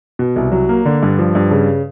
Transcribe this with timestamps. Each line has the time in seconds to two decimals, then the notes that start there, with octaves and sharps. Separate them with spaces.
0.19 B2
0.36 C2
0.52 F#3
0.69 A#3
0.85 D3
1.03 G2
1.19 F3
1.35 G2
1.51 C#3